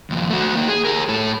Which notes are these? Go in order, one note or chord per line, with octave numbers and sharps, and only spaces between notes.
D#2 F3
A3 F#4
A#3 D#4
G#4
G4 A#4
A2 A4